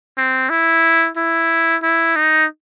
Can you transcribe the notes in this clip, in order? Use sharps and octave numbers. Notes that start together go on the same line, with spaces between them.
C4
E4
E4
E4
D#4